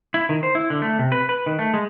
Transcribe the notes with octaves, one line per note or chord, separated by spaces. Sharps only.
E4
D#3
C5
E4
D3
A3
C3
B4
B4
D#3
A3
G#3